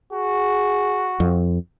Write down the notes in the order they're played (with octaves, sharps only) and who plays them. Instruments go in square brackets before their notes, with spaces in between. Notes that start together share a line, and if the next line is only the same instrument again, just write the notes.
[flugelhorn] F#4 [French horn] G#4
[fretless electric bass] F2